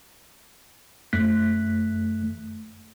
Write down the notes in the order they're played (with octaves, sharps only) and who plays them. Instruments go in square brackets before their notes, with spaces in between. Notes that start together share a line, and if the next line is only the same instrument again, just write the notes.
[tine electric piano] F#2 A3 F#6 B6